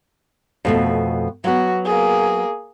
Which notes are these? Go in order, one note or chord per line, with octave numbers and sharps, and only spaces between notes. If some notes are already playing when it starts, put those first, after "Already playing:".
F2 B2 A3
F#3 B3 F#4
A#3 G#4